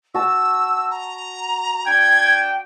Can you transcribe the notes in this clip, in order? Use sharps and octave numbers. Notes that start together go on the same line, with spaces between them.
F#4 A5 E6
A#5
D4 G5 G#6